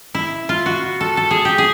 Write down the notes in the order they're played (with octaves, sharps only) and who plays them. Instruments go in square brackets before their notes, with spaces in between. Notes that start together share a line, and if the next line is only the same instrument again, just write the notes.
[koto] E4
F4
F#4
A4
A4
G#4
G4
G#4